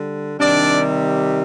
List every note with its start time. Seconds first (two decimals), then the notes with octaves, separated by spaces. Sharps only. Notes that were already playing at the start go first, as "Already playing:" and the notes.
Already playing: D3 G3
0.39 C3 D#3 G3 D4 D5